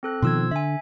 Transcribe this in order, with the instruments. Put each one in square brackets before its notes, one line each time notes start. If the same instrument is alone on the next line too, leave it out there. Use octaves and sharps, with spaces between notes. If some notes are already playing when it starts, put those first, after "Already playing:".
[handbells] C4 A4 F#6
[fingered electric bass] B2 D#3 F3 [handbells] C6 E6 G#6
[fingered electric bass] D3 [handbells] E5 G#5